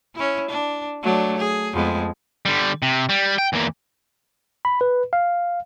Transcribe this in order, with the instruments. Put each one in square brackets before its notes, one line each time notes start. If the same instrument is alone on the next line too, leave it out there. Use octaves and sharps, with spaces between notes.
[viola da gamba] C#4 E4
D4
F#3 A3 D4
G#4
F2 G#3 B3
[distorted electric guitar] D3 G3
C3
G3
G5
E2 A#3
[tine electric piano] B5
B4
F5